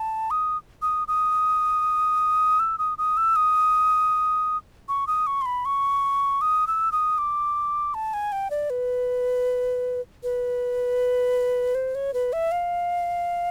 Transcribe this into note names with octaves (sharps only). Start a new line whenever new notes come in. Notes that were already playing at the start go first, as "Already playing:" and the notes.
Already playing: A5
D#6
D#6
D#6
E6
D#6
D#6
E6
D#6
C#6
D#6
C#6
C6
B5
C#6
D#6
E6
D#6
D6
A5
G#5
G5
D5
B4
B4
C5
C#5
B4
E5
F5